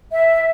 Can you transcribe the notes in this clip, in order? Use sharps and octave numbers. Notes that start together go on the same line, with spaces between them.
E5